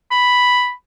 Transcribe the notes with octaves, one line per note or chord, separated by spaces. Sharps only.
B5